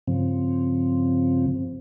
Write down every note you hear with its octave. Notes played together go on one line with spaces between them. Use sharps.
G2 C#3 F3 C4